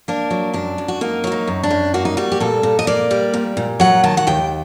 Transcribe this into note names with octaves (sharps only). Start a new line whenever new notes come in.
A#3 D4
F#3
F#2 D4
F#2
F#4
A#3 D#4
F#3 F#4
D#4
F#2
D4
F#2
A#3 F#4
D#4
G3 F#4
G4
A#2 A4
A#2
D#5
A#3 D5
G3
A#2
A#2
F#3 F#5
D#3 A5
F#5
D#2 G5